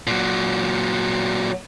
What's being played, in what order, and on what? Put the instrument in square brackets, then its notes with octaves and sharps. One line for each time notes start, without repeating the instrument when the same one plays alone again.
[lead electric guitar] A#2 F#3